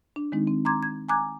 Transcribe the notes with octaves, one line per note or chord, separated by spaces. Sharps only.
D4
D#3 G#3 C4 D#4
C4
A#5 C6 D6 G#6
G#6
G#5 A#5 D6 F#6 G#6